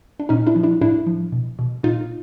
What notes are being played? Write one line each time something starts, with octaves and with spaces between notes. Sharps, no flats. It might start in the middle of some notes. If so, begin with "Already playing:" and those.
D4
A#2 C#4 D#4
D4 E4
F3
D4 E4
A2 D4 E4
F3
B2
B2
A#2 D#4 F4